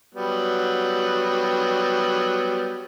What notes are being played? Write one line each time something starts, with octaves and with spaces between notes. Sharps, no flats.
F#3 G3 B3